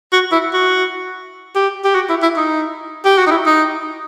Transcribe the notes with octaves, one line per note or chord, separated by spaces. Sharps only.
F#4
E4
F#4
G4
G4
F#4
E4
E4
D#4
G4
F#4
D#4
E4
D#4